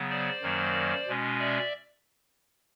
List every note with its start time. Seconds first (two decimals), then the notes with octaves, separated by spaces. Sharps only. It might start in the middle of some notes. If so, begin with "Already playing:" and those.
Already playing: C#3 F#3 B3
0.10 C5 D5
0.42 F#2 D#3 F#3 A#3
1.07 B2 G#3 C#4
1.39 D5 E5